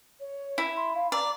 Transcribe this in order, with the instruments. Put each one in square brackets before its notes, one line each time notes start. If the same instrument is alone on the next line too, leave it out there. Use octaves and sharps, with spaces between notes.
[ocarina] C#5
[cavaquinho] E4
[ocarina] C6
F5
[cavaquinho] D5 [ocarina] A#5